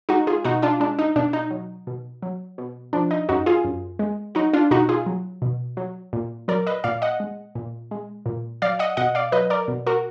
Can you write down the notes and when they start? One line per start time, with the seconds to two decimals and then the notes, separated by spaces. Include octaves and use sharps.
0.09 G#3 D#4 F#4
0.27 F4 G#4
0.45 B2 D#4 F#4
0.62 D4 F4
0.80 G#3 D4
0.99 D#4
1.16 B2 D4
1.33 D#4
1.51 F#3
1.87 B2
2.22 F#3
2.58 B2
2.93 F3 D4
3.11 D#4
3.29 F#2 D#4 F#4
3.46 F4 G#4
3.64 F#2
3.99 G#3
4.35 F#3 D#4 F#4
4.53 D4 F4
4.71 B2 D#4 F#4
4.89 F4 G#4
5.06 F#3
5.42 B2
5.77 F#3
6.13 A#2
6.48 F#3 A#4 D5
6.67 B4 D#5
6.84 A#2 D5 F5
7.02 D#5 F#5
7.20 G#3
7.55 A#2
7.91 G#3
8.26 A#2
8.62 F#3 D5 F5
8.79 D#5 F#5
8.97 B2 D#5 F#5
9.15 D5 F5
9.32 F#3 B4 D#5
9.50 A#4 D5
9.68 B2
9.87 F#4 A#4